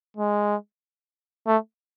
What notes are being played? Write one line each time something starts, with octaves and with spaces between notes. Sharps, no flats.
G#3
A3